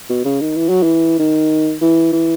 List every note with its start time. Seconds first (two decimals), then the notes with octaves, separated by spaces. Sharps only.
0.10 B2
0.25 C#3
0.41 D#3
0.56 E3
0.69 F#3
0.83 E3
1.19 D#3
1.82 E3
2.13 E3